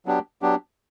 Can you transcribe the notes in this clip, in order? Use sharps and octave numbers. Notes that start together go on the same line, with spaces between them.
F#3 B3 D4 G4
F#3 B3 D4 G4